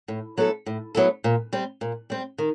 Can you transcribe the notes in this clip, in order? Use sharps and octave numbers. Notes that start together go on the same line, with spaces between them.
A2
F#3 B3 E4 A4
A2
F#3 B3 E4 A4
A#2
G3 C4
A#2
G3 C4
D#3